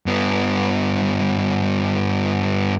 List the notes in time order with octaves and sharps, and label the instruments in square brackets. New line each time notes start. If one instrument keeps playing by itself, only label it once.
[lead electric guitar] G2 B3